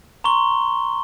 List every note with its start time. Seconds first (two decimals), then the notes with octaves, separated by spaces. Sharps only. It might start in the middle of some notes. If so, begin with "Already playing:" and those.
0.24 A#5 C6 C#6 G7